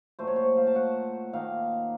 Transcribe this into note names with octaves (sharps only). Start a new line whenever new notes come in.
A#2 F#3 A3 C5
C#5
C5
F5
A5
F#5
D#3 A#3 D#4 F5